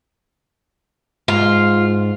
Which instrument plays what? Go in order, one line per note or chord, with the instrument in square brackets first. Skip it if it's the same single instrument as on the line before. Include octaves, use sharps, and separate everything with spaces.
[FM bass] G#2 [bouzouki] F4